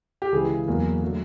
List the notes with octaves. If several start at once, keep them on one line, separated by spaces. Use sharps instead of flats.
G4
C#2 C#3 E3 G#4
E2 B2 F#3 A#3
D3 F#3 A3